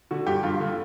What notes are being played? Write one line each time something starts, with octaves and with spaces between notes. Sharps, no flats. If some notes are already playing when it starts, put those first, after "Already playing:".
D3 F#4
G2 G4
G2 F4
D3